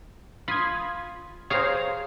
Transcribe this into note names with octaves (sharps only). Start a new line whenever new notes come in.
F4 B5 D#6 G#6
G#4 C5 C#5 F5 A#5